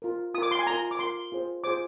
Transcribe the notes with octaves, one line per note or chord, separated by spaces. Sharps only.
F4 A#4
F4 A#4 D6 D#6
C6
G#5
F4 A#4 A#5
D6
F4 A#4 C6
F4 G#4 C5
F4 G#4 C5 D6